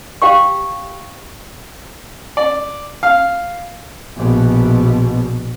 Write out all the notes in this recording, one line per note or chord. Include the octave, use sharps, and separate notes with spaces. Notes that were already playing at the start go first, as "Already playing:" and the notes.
G4 F5 G5 C#6
D5
F5
A#1 B2